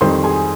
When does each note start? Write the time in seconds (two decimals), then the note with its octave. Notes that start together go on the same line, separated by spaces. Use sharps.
0.01 F2 D#3 G3 C5 C6
0.24 G#4 G#5